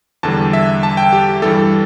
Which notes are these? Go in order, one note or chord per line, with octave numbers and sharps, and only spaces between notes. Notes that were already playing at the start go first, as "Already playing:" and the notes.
E2 D3 G3 A5
E5
A5
G5
G4
G2 E3 G3 A4